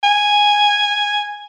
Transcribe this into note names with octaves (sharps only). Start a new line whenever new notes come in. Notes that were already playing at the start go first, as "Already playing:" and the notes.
G#5